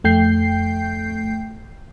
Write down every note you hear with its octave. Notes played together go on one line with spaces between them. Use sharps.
F2 A3 G5 G6 C7